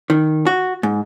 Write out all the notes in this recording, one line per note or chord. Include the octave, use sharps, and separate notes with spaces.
D#3
F#4
G#2